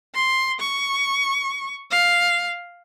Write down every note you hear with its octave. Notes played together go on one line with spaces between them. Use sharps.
C6
C#6
F5